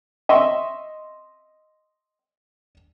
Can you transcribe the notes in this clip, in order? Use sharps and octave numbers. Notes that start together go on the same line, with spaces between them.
D#5 E5 C6 C#6 E6